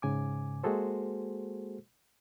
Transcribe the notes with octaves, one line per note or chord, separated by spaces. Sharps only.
G#2 C#3 G#5 D6
G#3 A#3 F#4 G#4 A4 C5